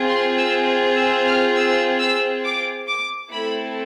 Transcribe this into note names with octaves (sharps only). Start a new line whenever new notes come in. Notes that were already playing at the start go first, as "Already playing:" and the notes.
Already playing: C4 F4 G#4
C6
E6
E6
F6
E6
E6
D6
D6
A3 C4 E4 A4 B5